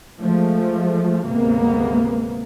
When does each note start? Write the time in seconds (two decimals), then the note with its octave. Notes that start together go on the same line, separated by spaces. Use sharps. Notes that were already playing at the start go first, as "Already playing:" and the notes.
0.20 F3 G#3 A3
1.26 G#1 D2 C3 G#3 A#3 B3